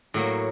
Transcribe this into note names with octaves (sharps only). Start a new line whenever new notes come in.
A2 F#3 A#3